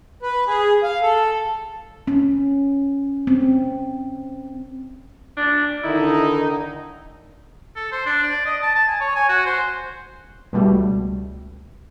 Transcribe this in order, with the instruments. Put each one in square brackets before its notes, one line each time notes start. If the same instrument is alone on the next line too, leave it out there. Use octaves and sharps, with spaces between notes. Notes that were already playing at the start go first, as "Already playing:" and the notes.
[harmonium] B4
G#4
F5
A4
[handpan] C#4
C4
[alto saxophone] D4
[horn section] D3 D#3 D#4 [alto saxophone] E4
[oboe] A4
C5
D4
D5
D#5
A5
A5
G#5
C#5
G#5
F#4
C5
[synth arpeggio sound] C#2 B2 G3 A3